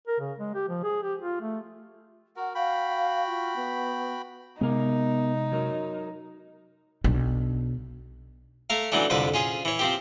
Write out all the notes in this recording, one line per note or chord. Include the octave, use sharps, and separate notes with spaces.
A#4
C#3
G#3
G4
F3
G#4
G4
F4
A3
F#4 A#4 F#5
F#4 F5 G5 B5
F4
B3
C3 G#3 B3 D#4 A#4
F#3 A#4
B1 D4
A3 A#4 F5
E3 F#3 A3 C#4 D4
C2 F2 D3 B4 D6
C#4 F4 G#4
E3 C#5
F3 C4 G4